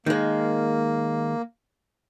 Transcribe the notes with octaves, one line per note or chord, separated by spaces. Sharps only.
D#3 G#3 A#3